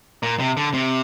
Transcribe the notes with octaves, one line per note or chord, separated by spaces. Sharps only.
A#2
C3
D3
C3